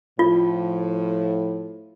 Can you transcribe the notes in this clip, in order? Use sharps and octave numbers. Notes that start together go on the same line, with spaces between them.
A2 F3 F4